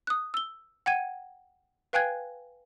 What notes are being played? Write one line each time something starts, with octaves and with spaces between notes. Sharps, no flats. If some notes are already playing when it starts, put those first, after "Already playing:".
D#6 F#6
E6 G7
F#5 G5 G#6 D#7
B4 F5 G5 G#5 F#6 G#6